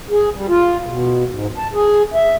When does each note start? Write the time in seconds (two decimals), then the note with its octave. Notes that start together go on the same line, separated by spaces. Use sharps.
0.11 G#4
0.35 G3
0.49 F4
0.86 B2
1.30 G#2
1.58 A5
1.74 G#4
2.14 E5